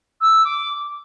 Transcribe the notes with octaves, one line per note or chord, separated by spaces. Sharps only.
E6
D6